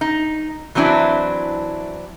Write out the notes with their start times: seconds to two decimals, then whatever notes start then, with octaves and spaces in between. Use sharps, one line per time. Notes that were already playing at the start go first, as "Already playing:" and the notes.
0.01 D#4
0.75 E3 F#3 C4 D4 E4